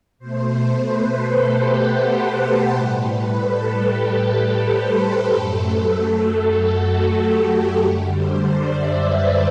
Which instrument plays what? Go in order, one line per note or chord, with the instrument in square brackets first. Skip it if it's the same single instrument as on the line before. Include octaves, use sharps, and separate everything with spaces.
[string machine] B2 A3 C5
B4
A4
G4
F#5
A4
B4
A2 G3
B4
A4
G4
G4
A4
C5
B4
F#2 F#3 A3 A4
F#4
G4
A4
F#2 D3 G3
C5
D5
E5
B4